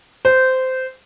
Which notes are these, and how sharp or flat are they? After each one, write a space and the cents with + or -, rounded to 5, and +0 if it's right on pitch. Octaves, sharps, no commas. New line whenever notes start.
C5 -15